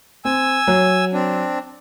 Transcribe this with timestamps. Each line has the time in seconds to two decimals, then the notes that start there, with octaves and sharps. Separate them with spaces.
0.25 C4 G#5 E6
0.67 F#3
1.13 C4 D4